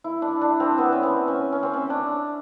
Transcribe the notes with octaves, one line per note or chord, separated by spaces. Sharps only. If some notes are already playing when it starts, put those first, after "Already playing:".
E4
D4
D4
C4
B3
C#4
C4
C#4
C#4
C4
C#4
D4